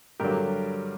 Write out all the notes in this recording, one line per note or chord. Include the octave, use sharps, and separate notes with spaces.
G2 D3 F#3 G4 A#4